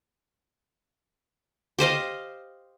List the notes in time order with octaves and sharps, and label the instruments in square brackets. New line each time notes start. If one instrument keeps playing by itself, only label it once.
[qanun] G4 C5 D#5 F5